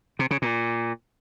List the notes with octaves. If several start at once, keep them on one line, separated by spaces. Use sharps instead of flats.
C3
C#3
A#2